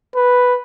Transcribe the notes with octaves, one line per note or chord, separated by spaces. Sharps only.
B4